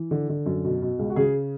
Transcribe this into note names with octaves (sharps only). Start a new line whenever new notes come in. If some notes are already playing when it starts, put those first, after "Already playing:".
Already playing: E3
D3
D3
F#2
B2
B2
C#2
F#4
C#3 G#4